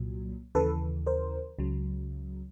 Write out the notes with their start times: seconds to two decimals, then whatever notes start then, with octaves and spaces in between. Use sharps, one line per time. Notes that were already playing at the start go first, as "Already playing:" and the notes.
Already playing: C2 A#2 F#3
0.55 D#2 C#3 E3 A4 B4
1.06 A#4 C5
1.59 C#2 C#3 F#3